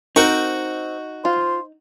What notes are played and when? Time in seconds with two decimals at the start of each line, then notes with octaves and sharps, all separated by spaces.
0.16 C4 D#4 F#4 A#4 C#6
1.25 F4 C5